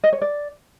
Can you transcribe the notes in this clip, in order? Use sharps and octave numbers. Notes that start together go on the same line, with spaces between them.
D#5
C#5
D5